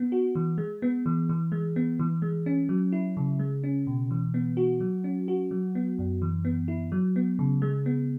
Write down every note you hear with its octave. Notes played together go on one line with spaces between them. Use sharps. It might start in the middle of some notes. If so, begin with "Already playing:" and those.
Already playing: B3
F#4
E3
G#3
B3
E3
E3
G#3
B3
E3
G#3
C#4
F#3
E4
C#3
G#3
C#4
B2
E3
B3
F#4
F#3
C#4
F#4
F#3
B3
F#2
E3
B3
E4
F#3
B3
C#3
G#3
B3